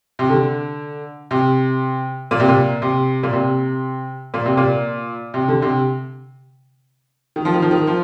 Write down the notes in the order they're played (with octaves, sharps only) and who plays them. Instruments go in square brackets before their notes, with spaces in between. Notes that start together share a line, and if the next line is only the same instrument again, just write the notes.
[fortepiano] C3
D3
C3
A#2
C3
A#2
C3
A#2
C3
A#2
C3
A#2
C3
D3
C3
D#3
F3
D#3
F3
D#3
F3